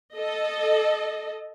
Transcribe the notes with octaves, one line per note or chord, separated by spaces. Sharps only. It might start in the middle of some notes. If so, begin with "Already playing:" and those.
A4 D#5